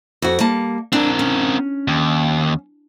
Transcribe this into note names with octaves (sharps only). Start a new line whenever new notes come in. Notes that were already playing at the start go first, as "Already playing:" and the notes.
F2 F#4
G3 A#3 A5
C4 D4 A#4
C#4
D#2